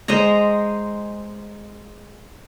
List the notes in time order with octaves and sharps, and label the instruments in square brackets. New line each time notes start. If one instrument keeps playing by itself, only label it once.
[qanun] G#3 C5 D#5 A#5